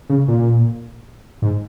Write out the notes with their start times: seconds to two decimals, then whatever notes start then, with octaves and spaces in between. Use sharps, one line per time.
0.10 C#3
0.28 A#2
1.42 G#2